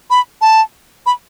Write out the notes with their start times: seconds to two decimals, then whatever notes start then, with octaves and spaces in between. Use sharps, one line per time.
0.10 B5
0.41 A5
1.06 B5